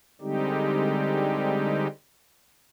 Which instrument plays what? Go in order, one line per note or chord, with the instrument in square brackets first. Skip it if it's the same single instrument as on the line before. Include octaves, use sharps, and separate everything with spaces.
[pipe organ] D3 G3 G#3 C4 D#4 G4